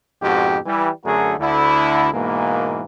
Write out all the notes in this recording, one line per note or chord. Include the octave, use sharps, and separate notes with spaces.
F2 G#2 B2 F#4 G4
E3 G3
F#2 D3 A3 F#4 G#4 A#4
D2 D3 E4
G#2 B2 E3 A#3